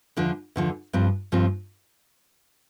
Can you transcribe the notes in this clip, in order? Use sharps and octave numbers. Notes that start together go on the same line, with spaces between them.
E2 D3 F3
E2 D3 F3
G2 F3 C4
G2 F3 C4